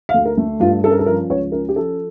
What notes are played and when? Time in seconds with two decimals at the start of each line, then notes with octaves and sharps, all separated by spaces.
0.09 F5
0.14 D2
0.25 A#4
0.37 A3
0.60 G2 F4
0.84 C#4 A4
0.91 A#4
0.99 A4
1.06 F3 A#4
1.29 C#2 C#5
1.52 C#4 A#4
1.69 G4
1.76 F3 A4